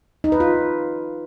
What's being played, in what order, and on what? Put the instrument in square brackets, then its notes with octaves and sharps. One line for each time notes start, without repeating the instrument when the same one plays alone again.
[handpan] D#4
B4
F4